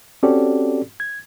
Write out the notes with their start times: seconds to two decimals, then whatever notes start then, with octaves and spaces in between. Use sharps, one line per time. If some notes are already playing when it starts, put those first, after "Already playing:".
0.23 C4 C#4 F#4 G4 A4 D5
1.00 G#6